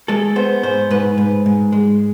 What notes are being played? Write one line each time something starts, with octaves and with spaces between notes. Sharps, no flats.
G#3 A4
B3 C5
G#2 C5
G#2 B4
G#2
G#2
G#3